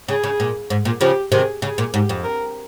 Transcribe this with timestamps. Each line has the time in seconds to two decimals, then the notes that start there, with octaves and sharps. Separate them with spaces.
0.08 C#3 G#4
0.24 C#3
0.40 A#2
0.70 G#2
0.85 A#2
1.01 C#3 F3 G4
1.32 C3 D#3 G#4
1.62 C#3 G#4
1.78 A#2
1.94 G#2 G4
2.09 F2
2.24 A#4